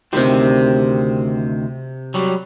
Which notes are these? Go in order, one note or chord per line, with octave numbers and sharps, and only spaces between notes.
D2 C3 D#3 C4 G4
F#3 G3